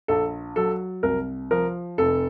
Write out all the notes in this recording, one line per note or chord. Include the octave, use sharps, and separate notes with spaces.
A#1 A4
F#3 A4
C2 A#4
F3 A#4
F1 A4